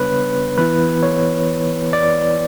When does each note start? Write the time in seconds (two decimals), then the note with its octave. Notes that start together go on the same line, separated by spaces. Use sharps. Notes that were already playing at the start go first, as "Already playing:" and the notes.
Already playing: C#3 G3 B3 D4 B4 C#5
0.58 E3 B3 E4 B4
1.03 C#5
1.93 D5